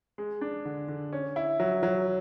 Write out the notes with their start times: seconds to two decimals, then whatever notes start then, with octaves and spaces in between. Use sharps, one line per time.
0.18 G#3
0.41 D4
0.65 D3
0.88 D3
1.13 C#4
1.36 E4
1.60 F#3
1.83 F#3